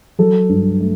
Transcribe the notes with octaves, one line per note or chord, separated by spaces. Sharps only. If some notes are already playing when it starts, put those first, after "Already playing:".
F#3 A4
G2
A3